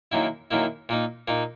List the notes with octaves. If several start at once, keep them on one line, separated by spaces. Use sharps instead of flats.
F#2 D#3 A#3 E4
F#2 D#3 A#3 E4
A#2 A#3 D#4
A#2 A#3 D#4